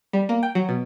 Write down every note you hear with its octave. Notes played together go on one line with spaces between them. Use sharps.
G3
A#3
G5
F#3
B2